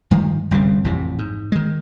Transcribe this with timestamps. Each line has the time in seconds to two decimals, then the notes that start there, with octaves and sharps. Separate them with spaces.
0.11 G2 D#3 F3 G#3
0.51 G1 C2 F#2 C#3
0.84 A1 F2 A2 C3
1.19 G#2
1.52 D#3 G#3